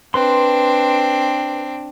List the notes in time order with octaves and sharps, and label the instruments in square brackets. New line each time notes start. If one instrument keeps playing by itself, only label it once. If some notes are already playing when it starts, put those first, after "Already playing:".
[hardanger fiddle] C4 D4 [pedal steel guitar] B4 C6